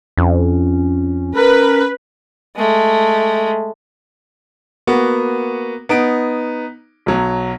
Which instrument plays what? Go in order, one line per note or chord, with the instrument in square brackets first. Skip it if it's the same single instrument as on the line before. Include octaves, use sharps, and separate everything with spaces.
[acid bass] F2 [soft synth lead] C#4
[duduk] A#4 [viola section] B4
[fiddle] G#3 A3
[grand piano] A#3 B3 F#4
B3 D#4 D7
B1 F#3